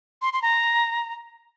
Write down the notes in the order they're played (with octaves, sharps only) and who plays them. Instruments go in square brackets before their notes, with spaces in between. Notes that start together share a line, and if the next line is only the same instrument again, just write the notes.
[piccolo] C6
C6
A#5